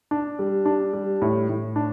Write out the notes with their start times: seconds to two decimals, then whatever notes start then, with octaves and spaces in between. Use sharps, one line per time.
0.11 D4
0.39 G3
0.66 D4
0.93 G3
1.22 A2
1.49 A2
1.76 D4